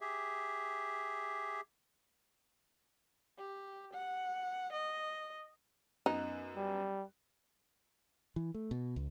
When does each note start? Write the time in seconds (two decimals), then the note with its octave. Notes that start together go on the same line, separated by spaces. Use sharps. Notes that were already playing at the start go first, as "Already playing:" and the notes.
0.01 G4 G#4 E5
3.38 G4
3.93 F#5
4.73 D#5
6.06 F#2 B3 D#4 F#6
6.57 G3
8.36 E3
8.54 A3
8.71 B2
8.96 C#2